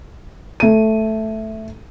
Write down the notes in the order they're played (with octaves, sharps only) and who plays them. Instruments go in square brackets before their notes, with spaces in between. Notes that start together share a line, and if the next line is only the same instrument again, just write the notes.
[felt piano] A3 D#7